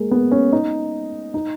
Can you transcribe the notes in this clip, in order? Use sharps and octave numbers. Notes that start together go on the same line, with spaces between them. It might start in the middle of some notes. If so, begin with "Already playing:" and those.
Already playing: G#3 A#3
B3
C#4
D#4
D#4